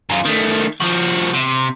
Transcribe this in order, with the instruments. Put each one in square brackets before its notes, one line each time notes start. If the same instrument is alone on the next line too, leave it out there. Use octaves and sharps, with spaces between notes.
[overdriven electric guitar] F#2 F4
D#3 A3
F3 F#4
C3